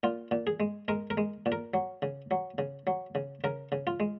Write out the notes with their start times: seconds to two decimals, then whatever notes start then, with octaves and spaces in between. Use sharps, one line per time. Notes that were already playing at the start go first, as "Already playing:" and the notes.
0.03 A#2 F4
0.31 A#2
0.47 G#4
0.60 G#3
0.88 G#3 A#4
1.10 A#4
1.17 G#3
1.46 A#2
1.52 A#4
1.74 F#3
2.02 C#3
2.31 F#3
2.58 C#3
2.87 F#3
3.15 C#3
3.44 C#3 A#4
3.72 C#3
3.87 F4
4.00 G#3